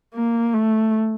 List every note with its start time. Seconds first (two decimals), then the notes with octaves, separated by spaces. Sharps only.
0.14 A#3
0.54 A3